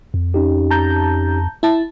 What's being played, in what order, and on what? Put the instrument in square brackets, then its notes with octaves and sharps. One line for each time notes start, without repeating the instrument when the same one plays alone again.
[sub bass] F2
[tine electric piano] C#4 D#4 G4
[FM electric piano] A5 A#5 G6
E4 A5